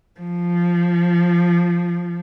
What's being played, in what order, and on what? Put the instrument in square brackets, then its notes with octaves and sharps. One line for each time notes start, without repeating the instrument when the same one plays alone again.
[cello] F3